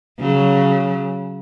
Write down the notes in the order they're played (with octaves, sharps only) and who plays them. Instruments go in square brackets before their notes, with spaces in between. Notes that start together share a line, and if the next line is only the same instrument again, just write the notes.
[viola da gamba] C#3 F#3